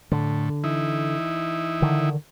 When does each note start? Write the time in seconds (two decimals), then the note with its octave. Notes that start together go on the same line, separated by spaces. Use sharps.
0.12 A2 D3
0.64 E3 D#4 E4
1.82 D3 D#3